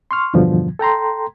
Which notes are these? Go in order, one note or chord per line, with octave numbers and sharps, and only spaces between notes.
C6 C#6 F6
E2 G2 B2 D3 F3
A4 G5 A#5 C6